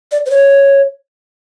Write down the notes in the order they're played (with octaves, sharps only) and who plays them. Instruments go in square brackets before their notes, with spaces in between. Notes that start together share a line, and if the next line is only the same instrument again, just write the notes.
[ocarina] D5
C5
C#5